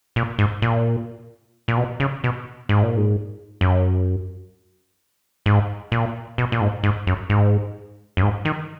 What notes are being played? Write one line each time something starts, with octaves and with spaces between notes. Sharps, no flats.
A#2
G#2
A#2
A#2
B2
C#3
B2
G#2
A#2
G#2
F#2
G#2
A#2
B2
A#2
G#2
G#2
F#2
G#2
F#2
G#2
D#3